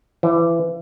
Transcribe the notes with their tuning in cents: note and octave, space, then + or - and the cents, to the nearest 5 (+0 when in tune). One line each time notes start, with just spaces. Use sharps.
E3 +25